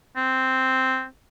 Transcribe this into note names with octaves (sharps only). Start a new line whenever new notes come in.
C4